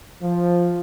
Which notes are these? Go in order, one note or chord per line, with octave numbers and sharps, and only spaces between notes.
F3